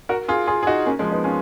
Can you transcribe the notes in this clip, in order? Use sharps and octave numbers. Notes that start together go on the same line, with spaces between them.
F#4 A#4
F4 G#4
F4 G#4
G#4
D#4 F#4
A#3 C#4
F3 G#3
B3 D#4
C#4 F4